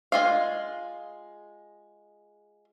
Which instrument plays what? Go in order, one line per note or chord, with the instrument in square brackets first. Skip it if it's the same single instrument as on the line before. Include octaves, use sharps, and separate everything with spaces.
[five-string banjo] G#3 F4 F5